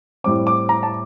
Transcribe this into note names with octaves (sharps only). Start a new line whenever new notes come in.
A2 G3 C4 D6
D6
A#5
A5